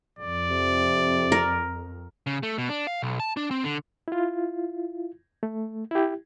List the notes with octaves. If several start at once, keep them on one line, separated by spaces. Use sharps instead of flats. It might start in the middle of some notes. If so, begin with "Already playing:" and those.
F2 D5
C3
A#4
C#3
A3
B2
D4
F5
B1
A5
D4
C4
D3
E4 F4
A3
E4 G4